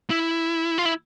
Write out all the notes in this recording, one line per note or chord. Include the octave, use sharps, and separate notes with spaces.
E4
F4
E4